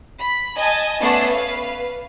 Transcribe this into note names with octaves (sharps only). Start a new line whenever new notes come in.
B5
D#5 G#5 A5
A3 B3 C#4 D5 F#5 C7
B4 F5